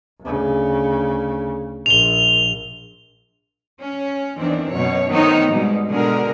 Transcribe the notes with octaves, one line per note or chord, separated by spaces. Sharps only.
D2 C#3
A#1 F7 G7
C#4
E2 D#3 E3 C4 D4
F#2 B2 C#5
D#3 A3 B3 C4 D#4 C#5
G#2 B2 G3 G#3
B2 D3 G#3 G#4 A#4